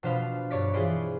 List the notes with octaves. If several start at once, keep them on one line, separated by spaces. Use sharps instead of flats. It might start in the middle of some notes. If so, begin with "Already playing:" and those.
B2 F3 D4 C5 F5 B5
G2 C#5 D5 B6
E3 F4 G#4 C5 D5 B5